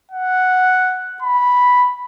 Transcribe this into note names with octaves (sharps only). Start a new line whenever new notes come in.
F#5
B5